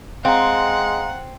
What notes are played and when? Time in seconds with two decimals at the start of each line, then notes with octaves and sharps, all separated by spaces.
0.25 G#3 C4 F5 F#5 A#5